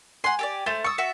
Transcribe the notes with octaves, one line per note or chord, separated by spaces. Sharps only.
F#5 G#5 C6
G4 A4 D5
A3 C5 A6
C#6 D#6 E6 C#7
F#4 E5